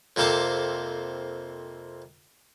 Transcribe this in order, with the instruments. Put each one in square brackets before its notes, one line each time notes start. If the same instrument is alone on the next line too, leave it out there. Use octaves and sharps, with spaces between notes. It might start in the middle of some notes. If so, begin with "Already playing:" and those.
[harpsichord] F2 C3 A#3 A4 C5 A5